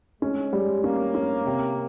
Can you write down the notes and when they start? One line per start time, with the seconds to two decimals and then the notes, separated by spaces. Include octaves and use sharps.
0.22 G#3 C#4
0.53 G3 G#3
0.84 A#3 C#4
1.15 C#4
1.46 C3